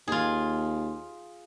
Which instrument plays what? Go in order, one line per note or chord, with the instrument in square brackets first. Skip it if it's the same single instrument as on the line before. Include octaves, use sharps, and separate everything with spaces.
[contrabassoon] D#2 [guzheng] F4 G#4